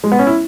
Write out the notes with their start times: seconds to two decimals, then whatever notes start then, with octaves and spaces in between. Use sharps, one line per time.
0.04 G#3
0.12 B3
0.19 C#4
0.27 E4